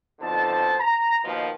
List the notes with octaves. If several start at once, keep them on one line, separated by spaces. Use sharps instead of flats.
F2 B2 D3 D#4 C5 A5
A#5
D#2 B2 D#3 F3